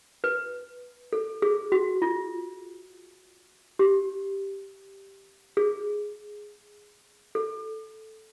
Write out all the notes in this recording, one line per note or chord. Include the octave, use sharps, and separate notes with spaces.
B4
A4
G#4
F#4
F4
G4
G#4
A4